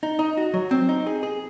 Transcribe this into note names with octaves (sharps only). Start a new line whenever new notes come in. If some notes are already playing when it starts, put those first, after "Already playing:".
D#4
D#4
F#4
F#3
C4
D#4
G#4
G#4